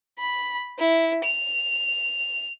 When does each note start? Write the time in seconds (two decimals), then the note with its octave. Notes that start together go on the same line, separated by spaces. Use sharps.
0.19 B5
0.79 E4
1.24 F7